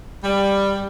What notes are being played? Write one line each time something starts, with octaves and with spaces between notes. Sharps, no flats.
G3